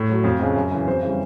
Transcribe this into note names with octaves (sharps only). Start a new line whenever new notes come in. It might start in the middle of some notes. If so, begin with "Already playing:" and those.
Already playing: A2
F#3
F2
C#3 F3 G#3
F#2
C#3 E3
F2 C5
C#3 E3 G3